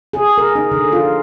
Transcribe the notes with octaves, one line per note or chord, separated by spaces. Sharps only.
G#4
A#4
D#4
D3
F4